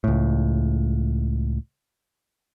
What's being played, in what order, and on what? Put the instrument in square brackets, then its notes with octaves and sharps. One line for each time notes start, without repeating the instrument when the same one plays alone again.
[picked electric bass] C#2 A2